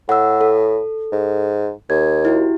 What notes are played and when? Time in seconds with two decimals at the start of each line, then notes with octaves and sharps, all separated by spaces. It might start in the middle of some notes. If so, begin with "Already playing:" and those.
0.09 A2 F#5 E6
0.41 A4
1.12 G#2
1.90 D#2 G#6
2.25 E4 F#4 G4